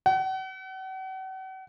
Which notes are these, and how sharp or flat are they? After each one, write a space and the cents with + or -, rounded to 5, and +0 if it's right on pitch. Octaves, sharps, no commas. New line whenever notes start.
F#5 +40